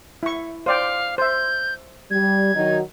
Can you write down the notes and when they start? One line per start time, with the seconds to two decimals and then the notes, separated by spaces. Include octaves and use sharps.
0.23 E4 C#6
0.66 C5 D5 F5 G5
1.18 C5 E5 G6
2.11 G3 G#6
2.54 D#3 F#3 D#4